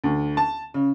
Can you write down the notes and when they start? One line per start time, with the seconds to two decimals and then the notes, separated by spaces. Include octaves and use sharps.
0.04 D2
0.37 A5
0.74 C#3